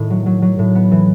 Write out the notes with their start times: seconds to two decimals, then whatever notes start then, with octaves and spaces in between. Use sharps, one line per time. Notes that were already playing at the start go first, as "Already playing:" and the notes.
Already playing: A2 D#3 A3
0.10 F#3
0.26 F#3
0.42 F#3
0.59 A2
0.75 B3
0.92 E3